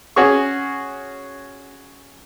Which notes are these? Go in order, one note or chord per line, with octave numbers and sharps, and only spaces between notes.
C#4 F#4 G#4 C#6